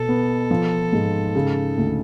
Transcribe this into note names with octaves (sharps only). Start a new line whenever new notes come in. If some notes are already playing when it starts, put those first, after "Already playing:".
Already playing: B2 A4
B3
F3
G#2
C#3
D2